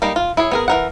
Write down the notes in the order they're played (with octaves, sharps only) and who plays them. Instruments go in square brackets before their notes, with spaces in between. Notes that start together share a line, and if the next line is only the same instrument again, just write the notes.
[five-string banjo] G3 A#3 D#4
F4
E4 G#4 C#5
B3 G#4 A#4
E3 A#4 F#5